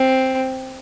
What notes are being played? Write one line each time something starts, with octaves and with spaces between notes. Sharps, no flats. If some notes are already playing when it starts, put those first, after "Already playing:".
Already playing: C4